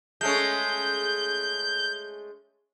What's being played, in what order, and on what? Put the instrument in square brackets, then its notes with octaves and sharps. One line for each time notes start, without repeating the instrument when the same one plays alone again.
[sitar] G#3 A3 C#4 [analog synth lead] G6